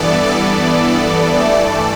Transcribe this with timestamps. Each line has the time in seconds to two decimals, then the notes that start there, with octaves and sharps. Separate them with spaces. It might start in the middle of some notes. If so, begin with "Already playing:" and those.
Already playing: G2 E3 B3 A4 D5
0.26 A4 D5
1.40 G2 E3 A3